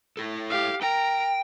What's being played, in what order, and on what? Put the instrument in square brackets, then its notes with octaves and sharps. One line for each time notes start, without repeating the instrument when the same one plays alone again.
[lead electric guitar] E4 A4
[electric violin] G4 F5
[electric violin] A#4 A#5 [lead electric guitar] G5